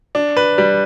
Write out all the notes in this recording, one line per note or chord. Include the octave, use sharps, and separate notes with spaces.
D4
B4
G3